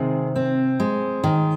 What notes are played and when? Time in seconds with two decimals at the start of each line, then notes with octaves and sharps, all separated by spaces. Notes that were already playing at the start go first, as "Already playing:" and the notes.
Already playing: C3 D#3 G#3 G#4
0.36 C4
0.80 G#3
1.24 D#3